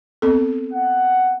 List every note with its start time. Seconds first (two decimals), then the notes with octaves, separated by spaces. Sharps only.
0.22 B3 C4 A4
0.73 F#5